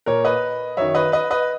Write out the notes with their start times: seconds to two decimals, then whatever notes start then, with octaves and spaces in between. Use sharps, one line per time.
0.06 A#2 A#4 C#5
0.25 B4 D#5
0.77 F#2 D#3 C#5 E5
0.95 B4 D#5
1.12 B4 D#5
1.30 B4 D#5